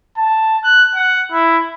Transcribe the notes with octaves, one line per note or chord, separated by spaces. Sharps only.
A5
F#6
F#5
E4